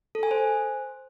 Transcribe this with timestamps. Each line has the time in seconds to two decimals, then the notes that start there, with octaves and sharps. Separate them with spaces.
0.15 A4
0.23 G#5
0.31 C5